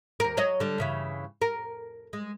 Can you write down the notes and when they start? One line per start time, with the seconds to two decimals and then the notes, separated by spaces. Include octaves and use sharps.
0.20 D#2 A#4
0.37 F#3 C#5 D#5
0.60 D3 G3
0.78 G2 C#3 E3
1.42 A#4
2.13 G#3